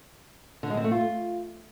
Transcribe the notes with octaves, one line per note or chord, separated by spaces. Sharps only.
D3
G#3
C4
A3
F4